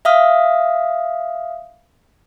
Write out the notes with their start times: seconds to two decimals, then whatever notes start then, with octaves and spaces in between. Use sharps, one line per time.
0.05 E5 F5 D#6 F6